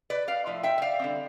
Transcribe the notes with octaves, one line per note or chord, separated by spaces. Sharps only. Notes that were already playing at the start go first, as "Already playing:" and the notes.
B4 D5
D5 F5
A2 F3 E4
E5 G5
E5
D5 F5
D3 G3 C4